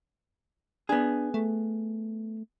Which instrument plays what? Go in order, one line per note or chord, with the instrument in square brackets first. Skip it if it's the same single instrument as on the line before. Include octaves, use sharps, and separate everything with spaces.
[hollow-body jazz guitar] B3 G#4 [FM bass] D4
[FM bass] A3